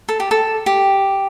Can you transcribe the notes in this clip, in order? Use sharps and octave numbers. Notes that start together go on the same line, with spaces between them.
A4
G4
A4
G4